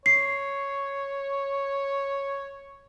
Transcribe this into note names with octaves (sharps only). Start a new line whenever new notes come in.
C#5 C7